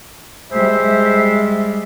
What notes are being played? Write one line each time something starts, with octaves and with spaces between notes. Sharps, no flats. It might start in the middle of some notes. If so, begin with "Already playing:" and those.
G3 G#3 C5 E5